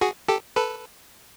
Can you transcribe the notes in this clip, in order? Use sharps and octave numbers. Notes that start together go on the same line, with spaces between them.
F#4 G#4
G4 A4
A4 B4